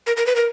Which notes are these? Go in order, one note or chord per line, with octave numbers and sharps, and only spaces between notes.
A#4
A#4
B4
A#4